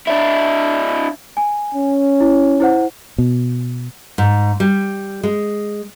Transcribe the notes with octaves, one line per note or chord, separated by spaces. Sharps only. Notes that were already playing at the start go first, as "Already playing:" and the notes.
D4 E4
G#5
C#4
E4
E4 C5 F#5
B2
G#2
G3
G#3